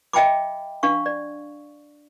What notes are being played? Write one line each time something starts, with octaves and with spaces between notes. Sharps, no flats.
D#5 E5 G5 A5 B5 D6
D4 F5 C#6
D5